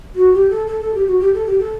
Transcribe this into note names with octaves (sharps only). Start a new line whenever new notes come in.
F#4
G4
A4
A4
A4
G4
F#4
G4
A4
G4
A4